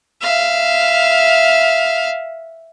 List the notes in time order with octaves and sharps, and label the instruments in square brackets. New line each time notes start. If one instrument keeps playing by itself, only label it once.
[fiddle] E5 F5